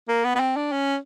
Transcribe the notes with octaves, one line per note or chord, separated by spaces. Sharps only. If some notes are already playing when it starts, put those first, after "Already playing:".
A#3
B3
B3
C4
D4
C#4